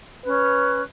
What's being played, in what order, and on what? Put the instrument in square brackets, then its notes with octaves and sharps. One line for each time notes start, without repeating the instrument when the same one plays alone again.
[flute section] C#4 F#6 [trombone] B4